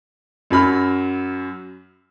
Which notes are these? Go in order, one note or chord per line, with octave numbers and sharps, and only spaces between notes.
F#2 F#3 B5 F6